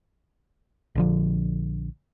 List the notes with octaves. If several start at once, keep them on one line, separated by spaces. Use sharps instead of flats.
A#1 D3 F3